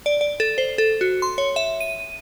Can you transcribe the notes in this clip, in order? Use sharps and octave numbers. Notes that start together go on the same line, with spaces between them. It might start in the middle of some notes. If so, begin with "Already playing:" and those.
D5
D5
A4
C5
A4
F#4
C6
C#5
E5
D#7